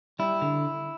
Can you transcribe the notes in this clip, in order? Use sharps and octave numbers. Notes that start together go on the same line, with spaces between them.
G3 E4
D3